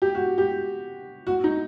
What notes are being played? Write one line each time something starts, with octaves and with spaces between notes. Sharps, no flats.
G4
F#4
G4
F#4
D#4